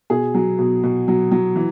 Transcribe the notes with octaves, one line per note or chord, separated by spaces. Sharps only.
B2 G#4
F#3
B2
B2
F#3
F#3
E3